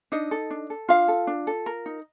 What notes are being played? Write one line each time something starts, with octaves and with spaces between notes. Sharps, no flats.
D4 D#4 D#5
A4
D4
A4
D4 F4 F5
A4
D4
A4
A#4
D#4